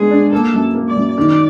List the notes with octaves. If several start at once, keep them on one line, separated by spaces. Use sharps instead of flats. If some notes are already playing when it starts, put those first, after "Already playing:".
Already playing: G#3 B3 D4 G#4
D4
A#3 A4
F#2
A#3
D5
F#2
D#3 D5